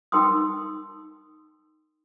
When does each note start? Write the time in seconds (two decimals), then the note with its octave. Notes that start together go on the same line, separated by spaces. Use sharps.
0.12 D#4 A#4 G5 C6 D#6